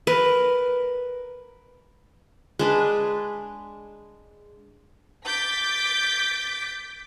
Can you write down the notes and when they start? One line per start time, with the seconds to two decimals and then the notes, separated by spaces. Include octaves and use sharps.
0.07 A#4 B4
2.59 G#3 D4 B4
5.25 D6 G6 A6 B6